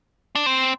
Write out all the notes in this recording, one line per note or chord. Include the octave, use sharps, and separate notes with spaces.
D4
C4